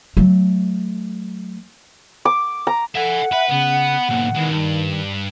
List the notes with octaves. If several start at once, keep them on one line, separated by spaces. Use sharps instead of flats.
F#3 A3
D6
A#5
A4 E5 F#5 G#5
B4 E5
C#3 B3
B1 G#2 A#3
D#3 E3 G#3
G2